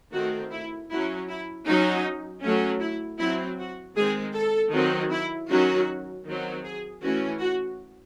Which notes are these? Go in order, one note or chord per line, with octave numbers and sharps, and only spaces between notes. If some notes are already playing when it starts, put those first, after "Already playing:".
D#3 A3 C4 F#4
E4
F#3 C#4 E4
E4
F#3 C#4 D#4
F#3 A3 C#4
E4
F#3 C4 E4
F#4
D#3 G#3 C4 G#4
A4
D#3 F#3 C4
E4
D#3 F#3 C#4 F#4
D#3 F#3 C4
G#4
E3 A3 C#4 F#4
F#4